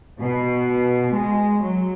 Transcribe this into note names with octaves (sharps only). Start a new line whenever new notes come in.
B2
G#3
F#3